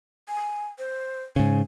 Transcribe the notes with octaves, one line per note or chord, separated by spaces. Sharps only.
G#5
C5
G#2 C#3 G#5